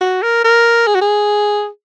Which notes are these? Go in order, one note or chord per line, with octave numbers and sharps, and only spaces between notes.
F#4
A#4
A#4
G#4
F#4
G#4